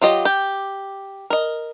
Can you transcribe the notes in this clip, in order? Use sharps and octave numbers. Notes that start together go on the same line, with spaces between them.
F#3 F4 G4 D#5
G4
A#4 D#5